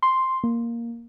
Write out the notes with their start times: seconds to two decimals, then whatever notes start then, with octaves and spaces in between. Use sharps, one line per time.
0.02 C6
0.44 A#3